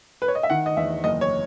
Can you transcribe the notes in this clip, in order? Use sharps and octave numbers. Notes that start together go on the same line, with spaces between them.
B4
C#5
D#5
E5
D#3 F#5
D#5
E2 E5
F#1 D#5
C#5